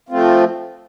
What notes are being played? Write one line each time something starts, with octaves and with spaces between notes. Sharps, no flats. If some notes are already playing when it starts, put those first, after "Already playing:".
F3 A3 C4 F4